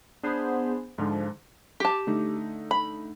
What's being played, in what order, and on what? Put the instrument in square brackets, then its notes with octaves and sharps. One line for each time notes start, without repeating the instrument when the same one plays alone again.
[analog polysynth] B3 G#4 C5 [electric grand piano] D4 B5
[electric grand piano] G#2 D3 G#3 [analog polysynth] F3
[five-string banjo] G4 A5
[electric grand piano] D3 A3 D#4
[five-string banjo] B5